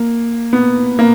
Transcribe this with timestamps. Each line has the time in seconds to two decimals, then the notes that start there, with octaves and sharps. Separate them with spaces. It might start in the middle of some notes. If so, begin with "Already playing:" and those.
Already playing: A#3
0.53 B3
0.99 A#3